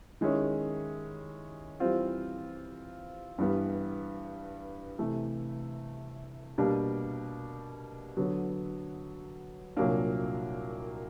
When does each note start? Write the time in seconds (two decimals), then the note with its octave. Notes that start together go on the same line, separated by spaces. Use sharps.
0.21 D#3 G#3 C#4 E4
1.80 E3 G3 C4 F4
3.38 G2 E3 G3 B3
4.99 C3 E3 A3
6.58 B2 G3 A#3 D4 G4
8.17 D3 F#3 B3
9.76 C2 A#2 F#3 A#3 D4